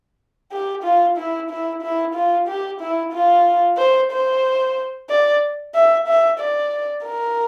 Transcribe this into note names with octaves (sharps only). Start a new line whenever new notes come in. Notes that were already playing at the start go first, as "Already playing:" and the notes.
G4
F4
E4
E4
E4
F4
G4
E4
F4
C5
C5
D5
E5
E5
D5
A#4